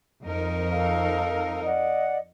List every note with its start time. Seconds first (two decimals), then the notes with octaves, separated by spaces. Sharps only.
0.23 F2 D#4 A#4
0.71 A4 F5 A#5
1.65 D5 D#5 F#5